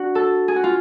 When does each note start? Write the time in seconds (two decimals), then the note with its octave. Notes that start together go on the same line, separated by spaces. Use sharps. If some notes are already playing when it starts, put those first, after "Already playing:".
Already playing: D4 F#4
0.15 A4
0.48 G#4
0.56 F#4
0.64 F4